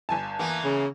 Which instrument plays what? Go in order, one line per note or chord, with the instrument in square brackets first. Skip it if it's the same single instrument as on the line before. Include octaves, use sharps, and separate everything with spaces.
[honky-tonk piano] G1 G#5 A5
[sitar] E3 A#3 B3
[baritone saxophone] C#3